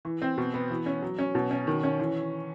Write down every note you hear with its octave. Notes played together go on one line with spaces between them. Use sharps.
E3
C4
B2
B3
E3
C#4
F#3
C#4
B2
C#4
D#3
C#4
E3